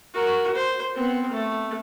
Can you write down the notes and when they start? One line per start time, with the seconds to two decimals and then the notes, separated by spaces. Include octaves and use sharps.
0.14 F#4 A#4
0.55 C5
0.95 B3 C4
1.31 A3